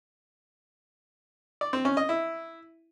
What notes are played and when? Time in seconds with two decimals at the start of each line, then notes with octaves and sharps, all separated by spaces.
1.61 D5
1.73 C4
1.85 C#4
1.97 D#5
2.09 E4